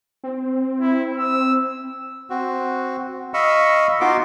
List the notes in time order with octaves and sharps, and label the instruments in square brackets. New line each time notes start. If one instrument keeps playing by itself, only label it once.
[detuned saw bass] C4
[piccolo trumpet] E4
E6
[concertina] C4 F#4
D#5 F5 B5 C#6 E6
B3 D#4 F4 F#4 C6 D6